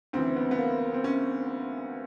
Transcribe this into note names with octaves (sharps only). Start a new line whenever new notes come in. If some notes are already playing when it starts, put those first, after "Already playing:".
D2 C#3 E3 C4
B3
B3
A#3
C4
C#4